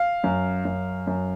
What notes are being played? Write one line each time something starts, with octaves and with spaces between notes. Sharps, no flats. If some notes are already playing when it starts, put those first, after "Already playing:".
Already playing: F5
F#2
F#2
F#2